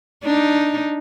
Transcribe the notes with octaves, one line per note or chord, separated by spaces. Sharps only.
D4 D#4